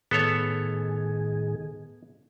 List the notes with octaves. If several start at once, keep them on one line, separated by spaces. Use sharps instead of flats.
A2 D#3 B3 G#4 A4 C#5